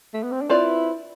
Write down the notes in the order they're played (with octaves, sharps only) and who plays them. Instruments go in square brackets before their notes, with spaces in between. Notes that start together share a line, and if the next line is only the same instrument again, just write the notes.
[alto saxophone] A3
B3
C4
D4
[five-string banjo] C4 F4 B4 D5 [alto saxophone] E4